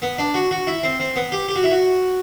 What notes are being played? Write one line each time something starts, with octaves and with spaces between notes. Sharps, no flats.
B3
D4
F#4
F#4
E4
C4
C4
B3
G4
G4
F#4
E4
F#4